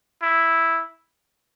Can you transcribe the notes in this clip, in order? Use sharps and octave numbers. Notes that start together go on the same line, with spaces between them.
E4